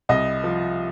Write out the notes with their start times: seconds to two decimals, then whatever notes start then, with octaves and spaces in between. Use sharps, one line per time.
0.09 C2 D#5
0.44 F3